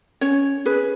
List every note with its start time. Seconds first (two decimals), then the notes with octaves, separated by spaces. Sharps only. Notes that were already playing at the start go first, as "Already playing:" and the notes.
0.21 C#4 C#5
0.66 G#4 B4